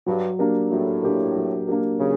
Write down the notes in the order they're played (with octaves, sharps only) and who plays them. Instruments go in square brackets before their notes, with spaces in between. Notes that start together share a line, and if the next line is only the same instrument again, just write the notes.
[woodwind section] G2 [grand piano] F#3
[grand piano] A#3 D4 G4 A#4
[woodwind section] A2 [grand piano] F#3
[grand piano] A#3 D4 G4 A#4
F#3
A#3 D4 G4 A#4
[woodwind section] C#3 [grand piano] F#3